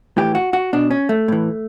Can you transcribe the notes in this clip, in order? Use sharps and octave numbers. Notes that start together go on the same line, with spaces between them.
A2 E3 G4
F#4
F#4
B2 D4
C#4
A3
A2 E3